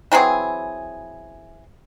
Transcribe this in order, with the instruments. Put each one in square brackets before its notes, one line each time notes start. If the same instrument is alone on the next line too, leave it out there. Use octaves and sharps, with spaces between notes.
[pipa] E3 F#3 C4 G#4